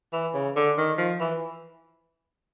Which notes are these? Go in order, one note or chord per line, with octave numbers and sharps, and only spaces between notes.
E3
C#3
D3
D#3
F3
E3